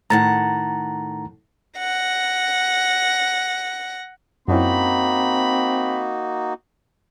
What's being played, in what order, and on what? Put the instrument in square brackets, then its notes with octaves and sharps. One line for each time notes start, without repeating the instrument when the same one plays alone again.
[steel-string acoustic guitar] A2 D#3 F#5 [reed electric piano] A#5 A6
[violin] F#5 A#6
[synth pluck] F#2 C#4 E4 [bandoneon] A#3 D#4 F#4 [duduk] C4 [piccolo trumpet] B5